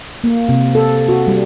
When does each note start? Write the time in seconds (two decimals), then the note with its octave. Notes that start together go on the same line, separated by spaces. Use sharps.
0.24 A#3
0.49 C3
0.75 A4
1.09 F#4
1.27 G3